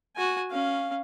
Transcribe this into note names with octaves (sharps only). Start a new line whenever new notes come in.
F#4 G#5
C#4 F5